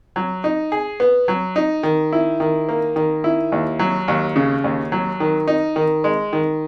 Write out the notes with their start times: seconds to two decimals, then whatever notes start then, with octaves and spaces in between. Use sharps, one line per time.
0.16 F#3
0.44 D#4
0.72 G#4
1.00 B3
1.28 F#3
1.56 D#4
1.83 D#3
2.12 E4
2.40 D#3
2.69 A#3
2.96 D#3
3.24 E4
3.52 D#2
3.79 F#3
4.08 D#2
4.36 C#3
4.64 D#2
4.92 F#3
5.20 D#3
5.47 D#4
5.76 D#3
6.04 G#3
6.33 D#3